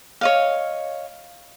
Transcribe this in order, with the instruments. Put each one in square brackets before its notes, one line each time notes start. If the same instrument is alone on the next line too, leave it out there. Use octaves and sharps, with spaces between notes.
[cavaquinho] C#5 D#5 F5